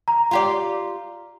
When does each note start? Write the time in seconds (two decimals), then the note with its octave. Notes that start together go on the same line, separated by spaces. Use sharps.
0.08 A#5
0.31 F4 G4 D5